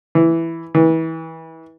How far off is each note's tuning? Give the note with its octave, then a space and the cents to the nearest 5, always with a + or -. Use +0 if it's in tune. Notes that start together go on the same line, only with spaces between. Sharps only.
E3 +5
E3 -25